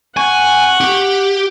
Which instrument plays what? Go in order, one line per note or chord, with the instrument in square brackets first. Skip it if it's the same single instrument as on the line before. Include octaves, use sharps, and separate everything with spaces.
[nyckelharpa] F#5 [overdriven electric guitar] G#5 [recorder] C#6
[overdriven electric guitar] G4